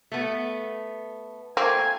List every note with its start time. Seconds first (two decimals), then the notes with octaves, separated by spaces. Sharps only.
0.12 A3 B3
1.57 A3 A#3 C4 G#5 G#6